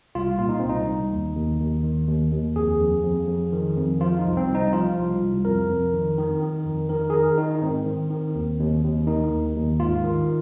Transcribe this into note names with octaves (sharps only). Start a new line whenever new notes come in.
C2 F4
A#2 F4
D#4
C2 C4
D#4
C2
D#2
D#2
D#2
D#3
D#2
D#2
F2 G#4
F2
F2
F2
D#3
F2
F3 F4
D#4
C2
C4
C2
D#4
F3 F4
C2
C2
F2 A#4
F2
D#3
D#3
D#3
F2
D#3 A#4
G#4
D#3 A#4
D#3 D#4
D#4
G#2 C4
D#3
D#3
D#2
D#2
D#2
D#3 D#4
D#2
D#2
G#2 F4
D#3